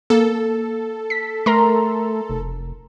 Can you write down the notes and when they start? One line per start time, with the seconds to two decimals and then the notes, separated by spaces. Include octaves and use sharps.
0.10 A#3 A4
1.10 B6
1.46 A3 A#4 A#5 C6
2.30 F1